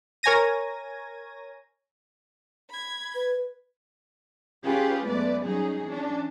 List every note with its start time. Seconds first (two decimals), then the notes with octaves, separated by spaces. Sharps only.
0.23 A#4 C#5 G#5 G#6 A#6 D#7
2.70 B5 G#6
3.15 B4
4.64 C#4 F4 G4 G#4 B4
5.06 F#2 G#3 A3 B3 B4 D5
5.46 F#3 G3 C#4 D#4 G#4
5.86 E3 C#4 D4